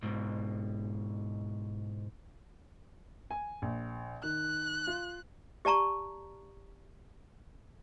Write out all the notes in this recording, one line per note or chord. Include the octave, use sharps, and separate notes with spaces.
G#2 B2
G#5
A#1
D#3 F#6
F4
G4 D5 A5 A#5 C#6